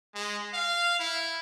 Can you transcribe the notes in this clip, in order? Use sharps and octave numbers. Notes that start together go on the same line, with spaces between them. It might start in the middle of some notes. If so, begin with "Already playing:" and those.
G#3
F5
E4